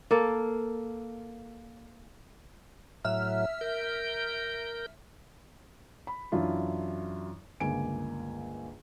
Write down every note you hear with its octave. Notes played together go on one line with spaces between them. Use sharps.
A#3 A4 F5
A2 F#3 E5 F6
A#4 G6
B5
F#2 E3 D4 E4 F4
G1 C#2 A#3 G#5 D7